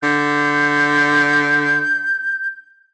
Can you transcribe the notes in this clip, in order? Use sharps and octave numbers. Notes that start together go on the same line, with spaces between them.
D3 G6